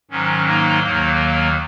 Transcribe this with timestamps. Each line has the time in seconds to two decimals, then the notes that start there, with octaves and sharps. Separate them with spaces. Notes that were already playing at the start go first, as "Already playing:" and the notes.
0.11 G#2 D#3 F#3 C#4
0.47 A#3 D#4
0.83 D#2 D#3 F#3 A#3